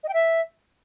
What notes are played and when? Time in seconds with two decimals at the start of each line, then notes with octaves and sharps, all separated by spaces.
0.03 D#5
0.09 G5
0.14 E5